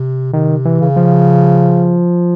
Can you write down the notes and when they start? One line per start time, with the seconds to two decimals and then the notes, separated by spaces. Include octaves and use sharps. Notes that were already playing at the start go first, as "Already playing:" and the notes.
Already playing: C3
0.33 C3 D#3
0.65 E3
0.81 C#3
0.96 F3